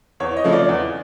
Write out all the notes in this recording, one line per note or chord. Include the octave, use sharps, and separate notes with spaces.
E2 C#5
D#5
C#3 F3 A3
D5
E2